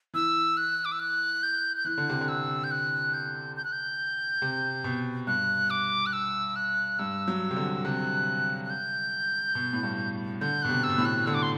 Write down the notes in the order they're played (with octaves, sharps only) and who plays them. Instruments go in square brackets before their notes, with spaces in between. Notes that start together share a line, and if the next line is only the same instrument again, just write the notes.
[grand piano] E3 [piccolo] E6
[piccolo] F#6
D6
E6
F#6
G6
G6
[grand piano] E3 [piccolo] F#6
[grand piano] D3
C3
D3
[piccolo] E6
G6
F#6
G6
G6
F#6
G6
[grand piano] C3
B2
[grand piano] G2 [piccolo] F#6
[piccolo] D6
F#6
E6
F#6
[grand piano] G2 [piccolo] E6
[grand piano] F#3
C3
D3
[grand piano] C3 [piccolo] F#6
[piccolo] F#6
G6
[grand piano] B2
A2
G2
[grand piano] D3 [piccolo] G6
[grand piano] B2 [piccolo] F#6
[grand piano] C3
[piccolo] E6
[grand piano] B2
A2
[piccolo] F#6
[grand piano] D3 [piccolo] E6
[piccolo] D6
C6